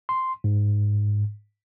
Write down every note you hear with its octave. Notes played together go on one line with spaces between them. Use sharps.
C6
G#2